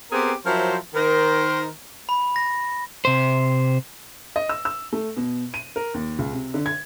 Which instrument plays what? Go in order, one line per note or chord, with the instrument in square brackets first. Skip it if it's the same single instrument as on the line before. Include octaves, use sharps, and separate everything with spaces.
[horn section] B3 C4 G4 G#4 A#4 C5
F3 F#3 E4 A#4 C5
D#3 A#4 C5
[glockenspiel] B5
A#6
[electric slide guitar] C3 C5
[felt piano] D#5
E6
E6
A3
B2
D#7
A#4
D#2
C#2
C3
D3
G#6